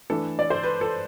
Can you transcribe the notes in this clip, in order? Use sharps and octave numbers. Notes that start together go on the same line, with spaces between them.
E3 A3 D4 A4
D5
C5
B4
A4